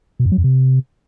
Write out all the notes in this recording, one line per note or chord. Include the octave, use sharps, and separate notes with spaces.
B2
F#2
F#3
F2
C3